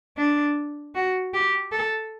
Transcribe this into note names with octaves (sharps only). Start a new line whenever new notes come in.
D4
F#4
G4
A4